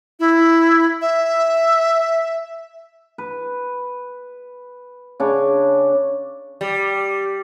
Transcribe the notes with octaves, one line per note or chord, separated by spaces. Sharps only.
E4
E5
B4
C#3 D4 C#5
G3